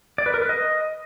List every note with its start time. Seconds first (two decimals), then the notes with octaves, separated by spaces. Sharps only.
0.18 D5
0.26 B4
0.34 A#4
0.42 B4
0.49 D#5